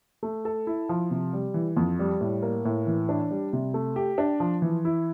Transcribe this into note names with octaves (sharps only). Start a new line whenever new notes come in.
A3
A4
E4
F3
C3
G3
E3
F2
G3
A2
A#3
A2
E3
D4
G3
C3
A3
G4
D4
F3
E3
E4